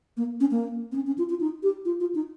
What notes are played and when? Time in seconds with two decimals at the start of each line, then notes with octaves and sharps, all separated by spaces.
0.17 A#3
0.40 C#4
0.51 A#3
0.92 C4
0.95 C#4
1.07 C#4
1.18 F4
1.30 F4
1.40 D#4
1.63 G4
1.85 F4
2.00 F4
2.15 D#4